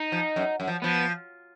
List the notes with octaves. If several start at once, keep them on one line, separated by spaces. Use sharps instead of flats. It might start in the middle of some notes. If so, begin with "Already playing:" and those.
Already playing: D#4
F3
F#2
F#2
F3
F3 B3